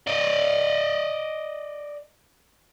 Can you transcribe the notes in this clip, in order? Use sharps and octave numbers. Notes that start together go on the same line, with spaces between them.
D5 D#5